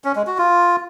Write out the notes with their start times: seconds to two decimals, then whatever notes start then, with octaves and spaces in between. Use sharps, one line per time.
0.04 C#4
0.16 G#3
0.27 F#4
0.38 F4